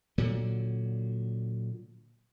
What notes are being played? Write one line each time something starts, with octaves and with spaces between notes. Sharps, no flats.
A#2 D3 F#3